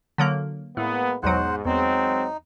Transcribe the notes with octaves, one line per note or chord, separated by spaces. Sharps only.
D3 F#3 A#3
A2 G#3 A#3 B3
B1 E2 G#2 F#3 C5 F#5
E2 F#3 G#3 C4 D#4